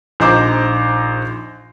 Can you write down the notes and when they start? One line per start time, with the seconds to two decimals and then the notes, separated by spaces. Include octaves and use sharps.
0.20 A#1 D#4 C5 A#5 D6